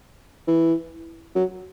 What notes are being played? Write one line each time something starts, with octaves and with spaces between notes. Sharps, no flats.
E3
F#3